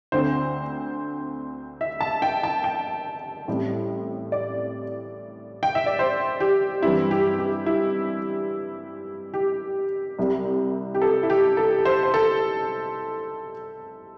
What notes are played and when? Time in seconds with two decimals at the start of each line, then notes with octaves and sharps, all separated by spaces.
0.12 D2 D3 C4 C5
1.81 E5
2.01 A5
2.22 G5
2.43 A5
2.64 G5
3.48 A1 A2 G3 C4
4.32 D5
5.63 G5
5.75 E5
5.86 D5
5.99 C5
6.40 G4
6.83 G2 E3 G3 C4 E4
7.11 G4
7.39 G4
7.66 E4
9.34 G4
10.19 C2 C3 G3
10.95 G4
11.02 A4
11.23 E4
11.30 G4
11.57 A4
11.85 C5
12.03 C5
12.14 A4